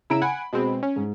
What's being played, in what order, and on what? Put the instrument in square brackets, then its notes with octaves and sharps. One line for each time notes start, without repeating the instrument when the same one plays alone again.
[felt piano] C#3 A#5 D7 [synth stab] E4 E6
[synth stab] F#5 G#5 [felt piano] B5
[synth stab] B2 G#3 C4
C#4
[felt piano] G#2